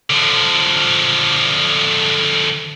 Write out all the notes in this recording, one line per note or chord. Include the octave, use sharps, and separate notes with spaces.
D3 F3